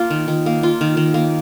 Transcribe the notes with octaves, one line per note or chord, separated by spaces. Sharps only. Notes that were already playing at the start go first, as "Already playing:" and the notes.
Already playing: A#3 F4
D#3
D#3
A#3
F4
D#3
D#3
A#3